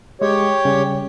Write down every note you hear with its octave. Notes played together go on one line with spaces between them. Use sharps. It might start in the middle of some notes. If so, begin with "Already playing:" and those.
G#3 G4 C#5
C#3 G3 C#4